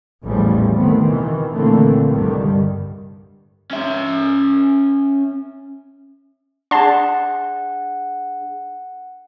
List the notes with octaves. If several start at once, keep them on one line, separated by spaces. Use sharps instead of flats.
A1 E2 C#3 E3 F3 G3
D#3 A3 B3 C4
B2 D#3 E3
A#2 D3 E3 A3 A#3 C4
C2 G2 D3 D#3 G3
C#4 E5
D4 G#4 F#5 A5 C6